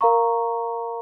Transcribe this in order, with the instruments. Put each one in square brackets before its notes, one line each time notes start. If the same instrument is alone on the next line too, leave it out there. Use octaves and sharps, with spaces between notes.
[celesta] A#4 F5 A#5 C#6